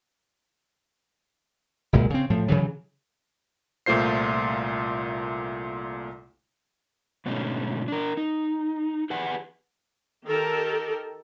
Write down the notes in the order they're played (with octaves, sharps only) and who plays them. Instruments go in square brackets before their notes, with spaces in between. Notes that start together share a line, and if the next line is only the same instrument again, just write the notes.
[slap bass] F#1 C2 A#2 G#3
C#3 C4
A2 F3
C#3 E3 F#3
[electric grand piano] C2 A#2 A3 F4 C5 C7
[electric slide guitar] G#2 B2 D3 A3 C#4 D#4
D4 A#4
D#4
G4 G#4 B4 F#5 G#5
[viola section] D#3 G4 A4 A#4